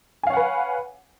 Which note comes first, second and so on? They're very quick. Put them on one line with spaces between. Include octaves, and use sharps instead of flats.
G#5 F5 C#5 F#5 B4